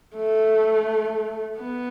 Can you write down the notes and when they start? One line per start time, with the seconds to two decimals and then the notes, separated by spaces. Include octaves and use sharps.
0.16 A3
1.59 B3